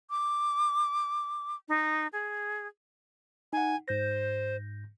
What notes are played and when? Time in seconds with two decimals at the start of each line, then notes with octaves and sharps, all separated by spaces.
0.10 D6
1.69 D#4
2.13 G#4
3.53 D#4 F#5 G#5
3.88 G#2 C5 G6 A#6